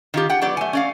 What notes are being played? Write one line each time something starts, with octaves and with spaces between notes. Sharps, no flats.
D#3 F4 G4
F#5 G5
F#3 B3 G4 D5
A3 G#5
C#4 D5 F5